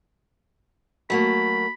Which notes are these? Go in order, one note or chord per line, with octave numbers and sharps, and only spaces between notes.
F#3 A3 A#3 B5